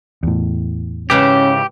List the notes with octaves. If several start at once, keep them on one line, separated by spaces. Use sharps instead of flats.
E2 A2
G#2 C#3 E3 C#4 G4